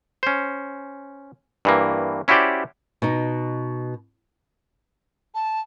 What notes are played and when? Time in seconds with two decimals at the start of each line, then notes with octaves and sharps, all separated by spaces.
0.23 C#4 C5
1.65 G2 E3 A#3
2.28 C#4 E4 F#4 G4 C5 D5
3.02 B2 D#4
5.35 A5